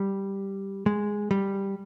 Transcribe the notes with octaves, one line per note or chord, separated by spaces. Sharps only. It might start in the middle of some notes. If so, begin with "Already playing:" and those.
Already playing: G3
G#3
G3